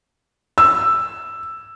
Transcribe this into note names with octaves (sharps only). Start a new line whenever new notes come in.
E6